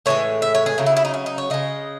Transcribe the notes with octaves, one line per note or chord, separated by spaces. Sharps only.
A2 E3 G#3 C#5
E5
C#5
G#4
C#3 F#3 A3
E4
E4
D#4
C#4
D#4
C#5
C#3 G#3 D#5